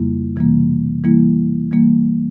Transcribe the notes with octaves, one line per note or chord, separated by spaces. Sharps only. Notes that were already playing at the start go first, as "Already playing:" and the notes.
Already playing: F2 C#3 G3 A#3 E4
C3 E3 G3 A#3
E3 G3 A#3 E4
E3 G3 A#3